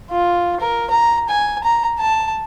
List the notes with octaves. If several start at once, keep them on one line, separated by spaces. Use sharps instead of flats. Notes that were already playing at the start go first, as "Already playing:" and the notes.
F4
A#4
A#5
G#5
A#5
A5